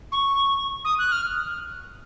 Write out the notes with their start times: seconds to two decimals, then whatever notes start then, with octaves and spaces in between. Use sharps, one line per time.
0.12 C#6
0.85 D#6
0.99 F#6
1.12 F6